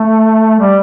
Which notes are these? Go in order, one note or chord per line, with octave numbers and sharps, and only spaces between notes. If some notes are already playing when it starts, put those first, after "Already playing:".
Already playing: A3
G3